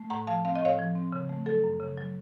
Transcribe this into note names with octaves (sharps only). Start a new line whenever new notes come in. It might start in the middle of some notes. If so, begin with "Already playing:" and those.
Already playing: A3
A2 F#5 A#5
F3 F5 A5
C4 F5
D#5
A2 C#5 F5
F3
C4
C#3
A3
F#3 A4
F#2
C#3
F#3